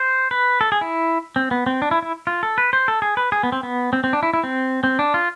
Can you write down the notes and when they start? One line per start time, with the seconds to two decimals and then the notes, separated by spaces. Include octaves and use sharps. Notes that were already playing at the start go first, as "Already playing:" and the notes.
Already playing: C5
0.31 B4
0.61 A4
0.72 G#4
0.81 E4
1.36 C4
1.51 B3
1.66 C4
1.82 D4
1.91 E4
2.03 E4
2.27 F4
2.43 A4
2.58 B4
2.73 C5
2.88 A4
3.02 G#4
3.17 B4
3.32 G#4
3.43 B3
3.52 C4
3.63 B3
3.93 C4
4.04 C4
4.13 D4
4.23 E4
4.34 E4
4.44 C4
4.84 C4
4.99 D4
5.14 F4